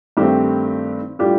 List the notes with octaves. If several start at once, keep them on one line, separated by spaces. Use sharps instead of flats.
G2 D#3 A3 C4 G4
A2 G3 D4 F4 G4